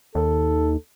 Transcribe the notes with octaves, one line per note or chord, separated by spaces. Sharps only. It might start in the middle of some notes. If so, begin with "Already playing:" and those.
D#2 A4